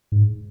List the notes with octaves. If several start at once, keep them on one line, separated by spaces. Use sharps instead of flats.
G#2